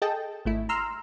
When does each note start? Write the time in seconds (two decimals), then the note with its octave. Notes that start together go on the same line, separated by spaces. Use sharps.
0.02 G#4 A4 D#5 G5 A5
0.45 G#1 A3 E4
0.69 A#5 C6 E6 F6